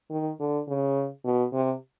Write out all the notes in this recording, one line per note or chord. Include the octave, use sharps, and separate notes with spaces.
D#3
D3
C#3
B2
C3